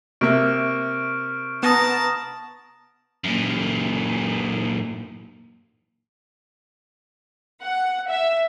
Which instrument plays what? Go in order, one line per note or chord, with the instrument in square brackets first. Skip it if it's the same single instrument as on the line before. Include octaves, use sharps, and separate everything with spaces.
[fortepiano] C3 A#3 E5 [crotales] C#6 F6 D7
[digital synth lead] B3 [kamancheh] A5 A#5 [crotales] D#6 A#6 E7
[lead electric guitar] F#2 A#2
[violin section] F#5
E5